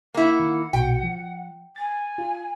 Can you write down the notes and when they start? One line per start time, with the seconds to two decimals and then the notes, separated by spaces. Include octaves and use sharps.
0.14 A#3 E4 F#5
0.40 D#3
0.73 B1 A#2 F#4 G5
1.03 F3
1.76 G#5 A6
2.18 F4